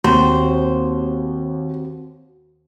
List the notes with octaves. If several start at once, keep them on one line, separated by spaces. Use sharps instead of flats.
D#2 C4 F#4 C5